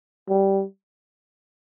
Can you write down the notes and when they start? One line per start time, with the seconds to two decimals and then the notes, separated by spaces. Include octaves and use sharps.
0.29 G3